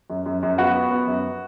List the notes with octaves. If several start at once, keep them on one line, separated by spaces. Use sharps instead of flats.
F#2
F#2
F#2
B3 F#4
B3
B3
F#2